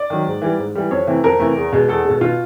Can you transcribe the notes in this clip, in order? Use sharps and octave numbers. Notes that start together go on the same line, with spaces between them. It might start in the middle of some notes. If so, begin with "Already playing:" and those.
Already playing: D5
D#3 F#3
G#2
E3 G3
G#2
E3 G3
F2 C#5
C3 E3 A3
F2 A#4
C3 E3 A3
E2
B2 G#3
E2 A4
B2 G#3
B2 F4